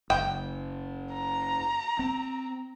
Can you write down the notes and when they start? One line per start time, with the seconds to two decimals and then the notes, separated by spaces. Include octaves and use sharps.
0.10 F#1 G5
1.14 A#5
1.99 C4